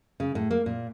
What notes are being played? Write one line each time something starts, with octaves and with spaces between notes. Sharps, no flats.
C#3
A2
A#3
A#2